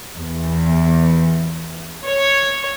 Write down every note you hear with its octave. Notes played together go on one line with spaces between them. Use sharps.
E2
C#5